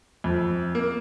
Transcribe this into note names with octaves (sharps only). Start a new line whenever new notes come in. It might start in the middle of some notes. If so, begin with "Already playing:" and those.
F2
A#3